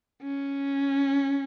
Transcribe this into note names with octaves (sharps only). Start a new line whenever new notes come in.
C#4